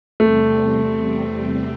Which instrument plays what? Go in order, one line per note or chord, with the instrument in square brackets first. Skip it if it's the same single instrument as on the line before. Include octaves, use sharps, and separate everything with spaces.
[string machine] E2 C3 G3 C4 [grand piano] A3